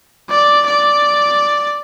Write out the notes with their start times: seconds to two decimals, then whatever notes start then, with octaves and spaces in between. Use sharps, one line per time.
0.30 D5
0.67 D5